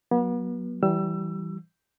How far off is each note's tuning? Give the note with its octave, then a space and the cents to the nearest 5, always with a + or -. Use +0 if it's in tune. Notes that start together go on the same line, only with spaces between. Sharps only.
F#3 +0 B3 -40
E3 +0 G3 -25 E6 +25